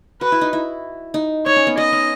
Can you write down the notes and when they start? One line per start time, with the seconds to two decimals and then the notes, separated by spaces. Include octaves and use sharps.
0.21 F#4 B4
0.32 E4
0.41 D#4
0.53 E4
1.14 D#4
1.46 D#4 C#5
1.56 C#4
1.67 B3
1.78 B3 D#5
1.92 C#4